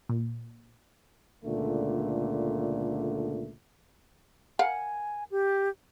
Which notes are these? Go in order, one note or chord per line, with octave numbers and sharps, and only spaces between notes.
A#2
C#2 A#2 D3 A3
A#4 F5 F#5 G#5
G4